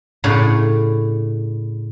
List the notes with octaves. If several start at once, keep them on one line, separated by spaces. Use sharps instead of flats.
A2 C#3 D4 C#5